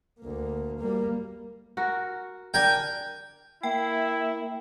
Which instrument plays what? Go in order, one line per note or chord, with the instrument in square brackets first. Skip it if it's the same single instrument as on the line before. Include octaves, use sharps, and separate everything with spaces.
[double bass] D2 A#3
G3 A#3
[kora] F#4 A#4
[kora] D4 A#4 [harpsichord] G5 G#5
[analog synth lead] A#3 [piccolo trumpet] E4 [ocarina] E5 [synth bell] G5